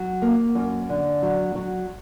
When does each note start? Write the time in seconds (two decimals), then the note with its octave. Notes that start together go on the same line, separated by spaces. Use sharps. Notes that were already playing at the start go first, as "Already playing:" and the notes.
Already playing: F#3
0.22 A#3
0.55 F#2
0.89 D3
1.23 F#3
1.55 F#3